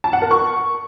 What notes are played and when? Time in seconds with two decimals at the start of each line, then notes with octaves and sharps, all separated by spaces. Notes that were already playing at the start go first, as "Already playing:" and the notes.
0.04 A5
0.13 F#5
0.22 A#4
0.31 C#6